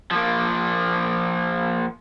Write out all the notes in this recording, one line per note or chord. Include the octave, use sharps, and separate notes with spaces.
F3 A#3